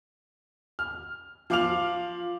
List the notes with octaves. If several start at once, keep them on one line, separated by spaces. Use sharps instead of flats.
F6
F3 F5 D6 F6 F7 F#7